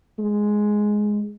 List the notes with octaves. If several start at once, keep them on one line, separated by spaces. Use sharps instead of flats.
G#3